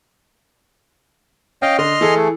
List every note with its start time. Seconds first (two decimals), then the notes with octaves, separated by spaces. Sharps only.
1.62 C#4 D#5 F5 G5
1.79 D3 D#5 C6 F6
2.01 E3 G#4 A4
2.16 A3